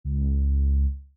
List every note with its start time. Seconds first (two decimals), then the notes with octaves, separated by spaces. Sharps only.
0.04 C#2